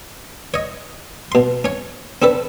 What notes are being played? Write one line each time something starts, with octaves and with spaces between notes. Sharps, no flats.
C#5 D#5
B2 C6
C#4 C#5
C4 D4 A4 B4